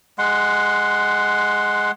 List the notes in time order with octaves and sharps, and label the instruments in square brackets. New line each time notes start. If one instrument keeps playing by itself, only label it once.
[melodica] G#3 F#5 C6